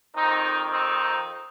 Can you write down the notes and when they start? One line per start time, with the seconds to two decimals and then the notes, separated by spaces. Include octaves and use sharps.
0.16 F2 D#3 C4 D#4
0.71 C4 D#4